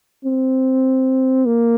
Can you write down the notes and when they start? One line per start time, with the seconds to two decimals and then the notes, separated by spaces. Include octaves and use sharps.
0.25 C4
1.46 A#3